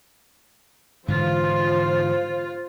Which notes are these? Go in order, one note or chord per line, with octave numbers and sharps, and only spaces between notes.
G#2 D3 E3 F4 C5